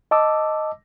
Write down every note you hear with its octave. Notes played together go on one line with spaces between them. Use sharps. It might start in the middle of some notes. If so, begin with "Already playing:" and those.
D#5 A5 D6 E6